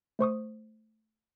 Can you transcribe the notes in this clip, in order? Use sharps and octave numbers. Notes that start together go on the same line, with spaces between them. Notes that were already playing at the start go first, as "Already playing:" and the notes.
A3 C5 C#6 D#6